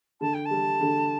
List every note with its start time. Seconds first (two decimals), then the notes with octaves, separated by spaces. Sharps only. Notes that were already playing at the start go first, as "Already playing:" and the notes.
0.21 D3 A5
0.34 G5
0.45 A5
0.50 G3
0.81 D3